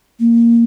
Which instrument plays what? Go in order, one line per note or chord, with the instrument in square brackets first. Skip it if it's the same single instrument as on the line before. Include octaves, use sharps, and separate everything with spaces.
[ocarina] A#3